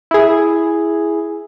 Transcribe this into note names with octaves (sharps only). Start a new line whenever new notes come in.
E4 G#4